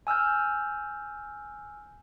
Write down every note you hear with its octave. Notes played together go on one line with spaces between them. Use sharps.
G#5 E6 F6 G6